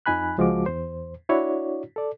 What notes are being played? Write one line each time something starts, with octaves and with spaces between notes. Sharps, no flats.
F2 F3 D#4 G#5 B5 F#6
C#2 F3 G#3 F#4 D6
E2 C5
D4 E4 F#4 C#5 D5
A4 D5